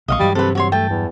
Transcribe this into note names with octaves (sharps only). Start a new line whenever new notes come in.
B1 B2 F#3 D#5 F5 C#6
G2 E3 F#3 G3
C3 A4 B4
C3 F#4 C#5 C6
A3 G5 A5
E2